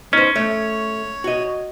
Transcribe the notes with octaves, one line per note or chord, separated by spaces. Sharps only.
C#4 D#4 C5
A3 C#5
F#4 D#5